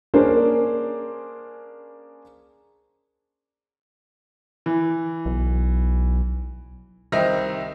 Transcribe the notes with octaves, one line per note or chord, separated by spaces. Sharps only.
A#3 C#4 D4 G#4 C5
E3
B1
C2 D#3 C4 D#4 E5 A#6